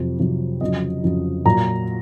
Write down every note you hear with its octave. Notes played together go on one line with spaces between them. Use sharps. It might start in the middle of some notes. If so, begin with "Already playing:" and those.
Already playing: F2 C3 F#3
F2 C3 F#3
F2 C#3 F#3 D#5
F2 C#3 F#3
A#2 F#3 A#5